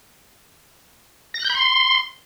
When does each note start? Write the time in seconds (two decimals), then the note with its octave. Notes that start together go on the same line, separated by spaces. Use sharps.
1.34 A#6
1.39 F#6
1.45 G6
1.50 B5
1.55 C6